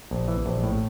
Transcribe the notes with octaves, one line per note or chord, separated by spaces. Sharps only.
A#1
E3
A#1
A2